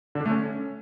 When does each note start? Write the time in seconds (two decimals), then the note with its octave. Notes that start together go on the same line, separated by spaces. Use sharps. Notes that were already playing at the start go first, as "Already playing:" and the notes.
0.15 D3
0.20 D4
0.26 A3
0.31 C#4